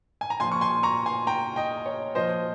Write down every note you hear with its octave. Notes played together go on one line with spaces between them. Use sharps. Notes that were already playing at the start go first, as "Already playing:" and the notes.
G#5
A#5
A#2 F3 G#5 C6
C#6
G#5 C6
A#5 C#6
G#5 C6
G5 A#5
D#5 G5
C#5
A#2 F3 C5 D#5